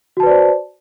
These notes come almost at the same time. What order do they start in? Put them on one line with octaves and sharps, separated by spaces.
F#4 A5 B4 D5 C5